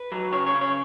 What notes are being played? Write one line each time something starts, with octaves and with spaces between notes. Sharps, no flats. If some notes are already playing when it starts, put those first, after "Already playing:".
Already playing: B4
F#3
C#3 C#5
C#5
C#3
C#5